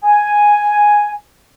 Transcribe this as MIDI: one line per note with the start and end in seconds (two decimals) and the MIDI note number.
0.04 1.15 80